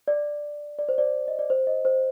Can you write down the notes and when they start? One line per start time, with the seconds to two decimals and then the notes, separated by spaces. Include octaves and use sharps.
0.08 D5
0.79 D5
0.89 C5
0.98 D5
1.28 D#5
1.39 D5
1.50 C5
1.67 D#5
1.85 C5